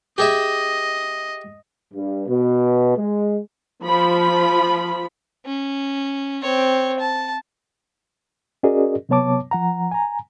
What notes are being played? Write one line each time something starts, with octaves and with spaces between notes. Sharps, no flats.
G4 G#4 D#5 E5
G2
B2
G#3
F3 B5
C#4
C4 C#5
A5
C#4 F#4 G#4 A#4 D5 D#5
C3 F#3 B3 C#5 A5 D6
F3 F#5 A#5
G#5 A#5